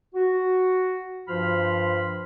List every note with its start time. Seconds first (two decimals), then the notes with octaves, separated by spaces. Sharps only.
0.14 F#4
1.28 G2 F3 F4 C5 B5 F6